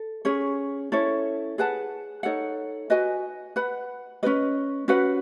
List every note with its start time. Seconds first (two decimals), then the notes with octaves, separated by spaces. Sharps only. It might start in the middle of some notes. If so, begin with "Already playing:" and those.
Already playing: A4
0.25 C#4 G#4 C#5
0.92 C#4 E4 A4 C#5
1.58 G#4 B4 F#5 A5
2.23 D#4 A4 C#5 F#5
2.90 F#4 B4 D#5 G#5
3.56 B4 F#5 B5
4.23 C#4 F#4 B4 D#5
4.88 C#4 F#4 B4 F#5